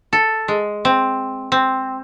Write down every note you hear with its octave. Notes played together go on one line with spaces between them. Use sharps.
A4
G#3
C4
C4